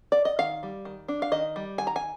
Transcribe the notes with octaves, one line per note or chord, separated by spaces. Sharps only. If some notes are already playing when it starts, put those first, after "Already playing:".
D5
D#5
D#3 F5
G3
D#3
D4
F5
D#3 D#5
G3
D#3 G#5
A#5
G#5